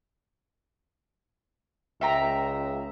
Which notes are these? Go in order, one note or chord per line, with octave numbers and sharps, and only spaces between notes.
C#2 E5 G5 A#5